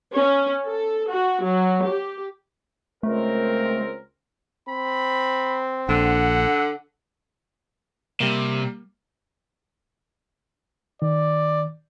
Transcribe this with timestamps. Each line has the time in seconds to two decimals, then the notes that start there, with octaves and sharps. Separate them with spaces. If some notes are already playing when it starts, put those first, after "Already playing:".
0.15 C#4
0.66 A4
1.09 F#4
1.46 F#3
1.84 G4
3.03 C#2 A3 C4 A#4
4.69 C4 B5
5.89 A#1 D3 F#5
8.20 C3 G3 A#3
11.02 D#3 D5